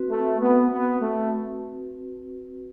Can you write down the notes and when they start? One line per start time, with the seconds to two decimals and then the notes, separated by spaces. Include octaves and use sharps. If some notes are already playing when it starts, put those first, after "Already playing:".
Already playing: C4 F#4 B4
0.09 A3
0.40 B3
0.71 B3
1.01 A3